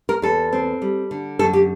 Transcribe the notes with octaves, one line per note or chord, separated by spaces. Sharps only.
A#4
E2 A4
C4
G3
D3
F#2 A4
G4